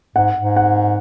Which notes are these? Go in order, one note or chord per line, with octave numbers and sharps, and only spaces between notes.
G#2 F#5
G#2
F#5